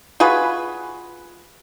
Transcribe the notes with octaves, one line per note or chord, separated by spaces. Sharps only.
F4 F#4 G#4 B4